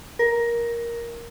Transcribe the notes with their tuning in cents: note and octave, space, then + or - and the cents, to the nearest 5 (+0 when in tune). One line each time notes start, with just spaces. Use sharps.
A#4 +10